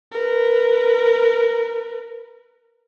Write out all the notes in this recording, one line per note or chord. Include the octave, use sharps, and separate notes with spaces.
A#4 B4